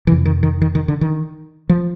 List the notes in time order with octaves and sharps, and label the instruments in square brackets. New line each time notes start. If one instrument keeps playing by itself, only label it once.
[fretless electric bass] F2 C3 E3
D#3
D#3
D#3
D#3
D3
D#3
F3